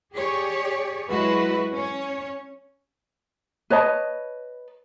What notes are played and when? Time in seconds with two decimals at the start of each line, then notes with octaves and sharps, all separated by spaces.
0.14 G4 G#4 C#5 D5
1.10 F#3 G#3 E4 F#4 B4
1.72 C#4 C#5
3.70 B4 C#5 D#5 A5